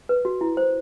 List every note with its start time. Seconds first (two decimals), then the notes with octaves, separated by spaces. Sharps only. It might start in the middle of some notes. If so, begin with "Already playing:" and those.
0.09 B4
0.25 F#4
0.41 E4
0.57 C5